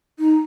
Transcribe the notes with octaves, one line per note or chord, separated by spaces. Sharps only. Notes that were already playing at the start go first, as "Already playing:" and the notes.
D#4